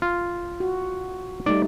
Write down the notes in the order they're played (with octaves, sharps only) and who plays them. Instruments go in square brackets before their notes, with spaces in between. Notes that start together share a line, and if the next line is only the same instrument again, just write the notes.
[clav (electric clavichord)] F4
[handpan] F#4
[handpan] G3 A3 D#4 [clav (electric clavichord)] D5